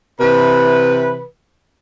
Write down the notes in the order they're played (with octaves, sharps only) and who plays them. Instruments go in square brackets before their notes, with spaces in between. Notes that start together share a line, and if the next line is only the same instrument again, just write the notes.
[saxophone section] C3 E3 B4